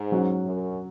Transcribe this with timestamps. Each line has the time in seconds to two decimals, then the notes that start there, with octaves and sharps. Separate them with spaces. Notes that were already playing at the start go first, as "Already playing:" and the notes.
Already playing: G#2
0.12 F#3 C#4 F#4
0.44 F#2